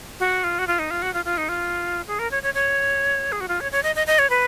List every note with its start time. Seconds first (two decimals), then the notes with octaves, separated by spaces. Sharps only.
0.20 F#4
0.44 F4
0.59 F#4
0.67 F4
0.79 D#4
0.91 F4
1.02 F#4
1.14 F4
1.25 F4
1.38 D#4
1.49 F4
2.08 G#4
2.19 A#4
2.31 C#5
2.43 C#5
2.54 C#5
3.32 G#4
3.40 F#4
3.48 F4
3.61 C#5
3.72 C#5
3.83 D#5
3.96 D#5
4.07 D#5
4.19 C#5
4.30 B4